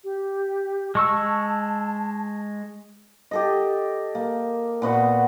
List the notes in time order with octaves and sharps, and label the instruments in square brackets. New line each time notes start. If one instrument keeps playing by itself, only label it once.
[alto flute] G4
[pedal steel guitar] G#3 C#6 E6 [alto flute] A5
[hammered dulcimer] G4 A4 D#5
A#3
A#2 B3 F#4 F#5